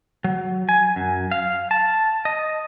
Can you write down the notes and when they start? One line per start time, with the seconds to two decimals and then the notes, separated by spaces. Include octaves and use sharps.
0.24 F#3
0.69 G#5
0.96 F#2
1.31 F5
1.71 A5
2.25 D#5